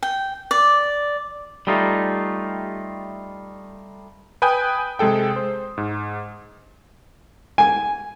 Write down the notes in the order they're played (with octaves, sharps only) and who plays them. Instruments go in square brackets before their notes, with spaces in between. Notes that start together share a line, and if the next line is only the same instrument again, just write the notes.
[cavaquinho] G5
D5
[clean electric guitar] G3 A3 D#4 F4
[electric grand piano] B4 G5 G#5 D#6 G6
C3 G#3 G#4 A4 G5
C5
G#2
[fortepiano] G#5